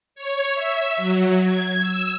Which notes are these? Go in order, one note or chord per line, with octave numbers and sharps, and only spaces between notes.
C#5
E5
F#3
G#6
E6